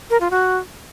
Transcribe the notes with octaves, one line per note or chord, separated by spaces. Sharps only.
A#4
F4
F#4